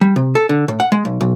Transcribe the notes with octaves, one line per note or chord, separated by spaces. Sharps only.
G3
C3
A4
D3
A2
F#5
G#3
B1
B1